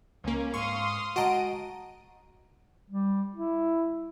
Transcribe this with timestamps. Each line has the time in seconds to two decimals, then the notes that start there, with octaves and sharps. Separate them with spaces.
0.24 C#2 A#3 C#4
0.54 G#2 F5 C6 C#6 D#6
1.16 G#3 F#4 D#5 F#5 A5 A#5 D7 D#7
2.91 G3
3.36 E4